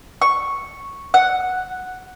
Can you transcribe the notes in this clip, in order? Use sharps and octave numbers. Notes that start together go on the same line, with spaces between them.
C#6
F#5